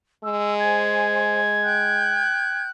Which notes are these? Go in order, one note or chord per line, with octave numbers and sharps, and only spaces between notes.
G#3 E6
C5 G#5 G#6
G5 F#6 G6